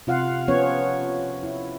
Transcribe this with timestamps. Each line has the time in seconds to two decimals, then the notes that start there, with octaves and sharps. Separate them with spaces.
0.07 C3 F4 F5 F#5
0.48 F3 B3 C#4 C#5
1.43 E4